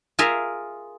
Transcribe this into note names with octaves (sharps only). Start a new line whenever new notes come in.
F4 G#4 A#4 E5